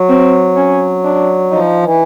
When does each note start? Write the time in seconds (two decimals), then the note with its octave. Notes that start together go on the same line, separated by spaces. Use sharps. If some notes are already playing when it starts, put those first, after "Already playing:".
Already playing: F#3
0.09 C4
0.57 C#4
1.05 D4
1.51 F3 D#4
1.83 E3